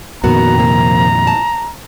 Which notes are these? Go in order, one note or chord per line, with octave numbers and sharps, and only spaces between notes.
F2 A#2 D#3 B3 F#4 A#4 A#5
C3 F3 A#3
A5